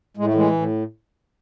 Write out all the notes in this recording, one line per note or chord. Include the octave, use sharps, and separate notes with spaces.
A2 G#3
A3
E3 G#3
A2